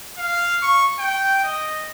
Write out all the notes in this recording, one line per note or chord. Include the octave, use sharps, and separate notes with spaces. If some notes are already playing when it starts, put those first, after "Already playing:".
F5
C#6
G5
D#5